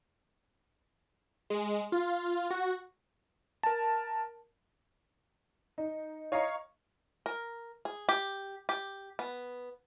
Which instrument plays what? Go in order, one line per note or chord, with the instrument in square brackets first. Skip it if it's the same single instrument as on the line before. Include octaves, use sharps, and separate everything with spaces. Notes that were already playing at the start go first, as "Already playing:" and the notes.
[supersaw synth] G#3
F4
F#4
[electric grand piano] A#4 A5
[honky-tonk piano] D#4
C#5 D#5 F5 A#5 C#6
[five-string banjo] A#4
G#4
G4
G4
B3